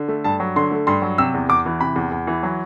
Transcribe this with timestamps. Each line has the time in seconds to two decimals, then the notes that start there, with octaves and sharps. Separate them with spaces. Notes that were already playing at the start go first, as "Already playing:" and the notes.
Already playing: D3
0.08 A3
0.24 G2 A5
0.40 F#3
0.56 D3 C6
0.72 A3
0.87 G2 C6
1.02 F#3
1.18 C3 E6
1.34 E2
1.49 E2 D6
1.66 E3
1.80 C3 B5
1.96 E2
2.12 E2
2.27 E3
2.43 F#3